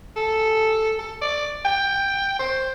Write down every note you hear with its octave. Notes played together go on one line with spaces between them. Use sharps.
A4
A4
D5
G5
C5